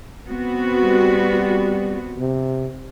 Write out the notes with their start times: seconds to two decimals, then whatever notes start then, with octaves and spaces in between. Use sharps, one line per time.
0.29 B3 C4 F#4
0.84 G3
2.19 C3